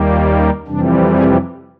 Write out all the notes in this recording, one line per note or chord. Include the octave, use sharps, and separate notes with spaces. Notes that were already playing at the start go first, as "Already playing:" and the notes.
Already playing: D#2 D#3 G3 A#3
F4
C#4
F2 C3 E3 G3 D4
G#4